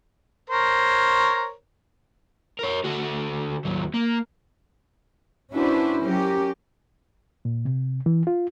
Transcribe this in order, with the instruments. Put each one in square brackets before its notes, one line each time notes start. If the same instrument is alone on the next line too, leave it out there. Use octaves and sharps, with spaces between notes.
[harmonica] A#4 C5 C#5
[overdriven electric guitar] A#4 C#5
D3 F#4
D#2 F#3
A#3
[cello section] C#4 D4 E4 F#4 B4 C5
F#3 C#4 G4 A#4
[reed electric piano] A#2
C3
E3
F4